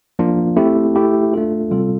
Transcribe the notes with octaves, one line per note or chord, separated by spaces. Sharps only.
F3 A#3 D4 F4
A3 C4 E4 G4
A3 E4 G4
A3 D4 F4 A4
C3 G3 C4 F4 A4